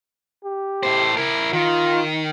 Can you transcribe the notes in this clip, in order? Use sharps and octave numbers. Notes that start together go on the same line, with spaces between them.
G4
A2 C5
E4 A#4
D#3 F4